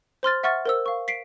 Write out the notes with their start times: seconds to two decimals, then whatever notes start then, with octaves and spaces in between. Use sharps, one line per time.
0.23 C5 C6 F6 A6
0.43 E5 F#5 C#6 F6 A6
0.66 A#4 C5 E6
0.86 F5 C#6
1.08 B6 C7 D7